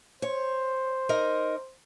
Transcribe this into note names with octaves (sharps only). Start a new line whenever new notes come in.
C5 C#5
D#4 A#4 D#5